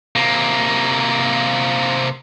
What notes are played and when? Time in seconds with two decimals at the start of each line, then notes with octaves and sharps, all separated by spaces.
0.16 C3 A#3